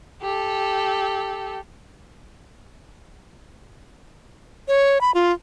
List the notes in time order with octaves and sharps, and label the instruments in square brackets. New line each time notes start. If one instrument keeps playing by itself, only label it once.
[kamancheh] G4 A4
[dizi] C#5
B5
F4